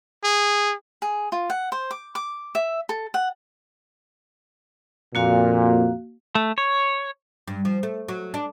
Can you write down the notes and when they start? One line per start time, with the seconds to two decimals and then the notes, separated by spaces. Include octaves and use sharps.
0.24 G#4
1.02 G#4
1.32 F4
1.50 F#5
1.72 C5
1.91 D6
2.15 D6
2.55 E5
2.89 A4
3.14 F#5
5.15 F2 A#2 A#3 F#4 F5
6.35 A3
6.58 C#5
7.47 G2
7.65 F3
7.83 A3
8.08 F#3
8.34 D4